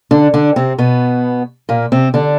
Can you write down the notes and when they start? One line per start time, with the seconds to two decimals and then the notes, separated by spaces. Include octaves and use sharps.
0.11 D3 D4
0.34 D3 D4
0.56 C3 C4
0.78 B2 B3
1.69 A#2 A#3
1.92 C3 C4
2.14 D3 D4